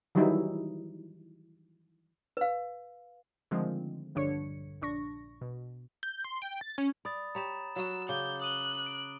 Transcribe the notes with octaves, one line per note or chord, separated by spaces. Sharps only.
D#3 E3 F#3 G3 D#4 E4
B4 F5
D3 D#3 F3 G#3 A3 C4
A#1 G2 D3 D4 C#5 C#7
A#1 D4 C#6 A#6
B2
G6
C6
G5
A6
C#4
D5 B5 D#6 A6
G4 C#5 A#5 B5 E7
F#3 F#4 E6
C#3 D6 G6
D#6 F#6 D#7 G7
D7 F#7